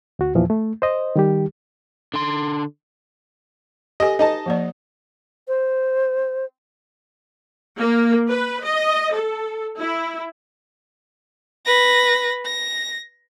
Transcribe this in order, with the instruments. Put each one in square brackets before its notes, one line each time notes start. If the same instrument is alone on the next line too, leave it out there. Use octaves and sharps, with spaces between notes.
[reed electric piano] D2 F#4
E2 A#2 E3 F3
A3
C5 D#5
D#3 G3 G4
[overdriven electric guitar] D3 C6
[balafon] G4 A4 G#5 [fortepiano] D#5
[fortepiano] D#4 D#5 A5
[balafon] F3 A#3 D5
[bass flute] C5
[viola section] A#3
B4
D#5
A4
E4
[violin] B4 A#6
A#6